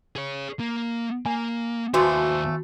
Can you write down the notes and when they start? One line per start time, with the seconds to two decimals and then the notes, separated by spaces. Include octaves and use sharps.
0.16 G#4 C#5
0.60 A#3
1.26 A#3 G#5
1.94 D#2 E3 F3 A3 F#4 C5